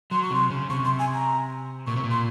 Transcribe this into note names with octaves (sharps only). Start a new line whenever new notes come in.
F#3 C6
C#6
C3 C6
C#3
C3 C#6
C6
G#5
A#5
A#2 C#6
C3
A#2
C6